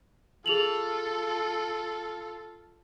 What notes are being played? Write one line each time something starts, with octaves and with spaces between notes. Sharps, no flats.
F4 G#4 A4 F7 F#7